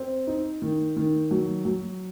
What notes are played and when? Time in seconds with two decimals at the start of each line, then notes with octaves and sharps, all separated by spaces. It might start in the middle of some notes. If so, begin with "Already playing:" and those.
Already playing: C4
0.27 D#4
0.62 D#3
0.96 D#3
1.31 F#3
1.65 F#3